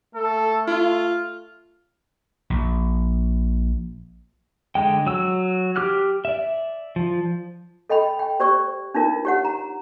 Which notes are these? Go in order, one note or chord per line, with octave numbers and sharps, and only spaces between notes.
A3 A4
F4 F6
A#1
D3 G#3 G5
F#3 E6
G4 D6 F6 F#6
D5 E5
F3
A4 D#5 G5 B5
G5
G4 C5 D5 C#6 E6
D4 D#4 F4 A#4
G4 C#5 F#5
A#5